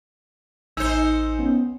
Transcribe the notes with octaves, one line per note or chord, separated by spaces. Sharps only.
A1 D#4 C5 G#5 E6 G6 C#7
B3 C#4